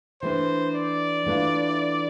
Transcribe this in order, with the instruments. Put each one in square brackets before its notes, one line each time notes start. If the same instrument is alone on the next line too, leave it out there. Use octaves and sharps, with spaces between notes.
[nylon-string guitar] E3 A3 D4 [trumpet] C5
[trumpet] D5
[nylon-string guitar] E3 A3 D4 F4